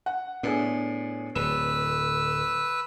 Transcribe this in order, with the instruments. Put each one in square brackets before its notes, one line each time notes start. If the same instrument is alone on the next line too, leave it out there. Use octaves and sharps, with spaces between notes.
[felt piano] F#5
[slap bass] A2 [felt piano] B3 D4 G#4
[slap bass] D1 [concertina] B4 E6 [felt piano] E7